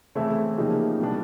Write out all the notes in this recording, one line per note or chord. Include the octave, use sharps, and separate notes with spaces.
C#3 E3 A3 C4 E4
C#3 F3 A#3 D#4 G4
B2 G3 B3 D4